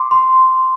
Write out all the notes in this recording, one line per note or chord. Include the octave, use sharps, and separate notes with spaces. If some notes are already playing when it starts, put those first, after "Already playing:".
Already playing: C6 D6
C6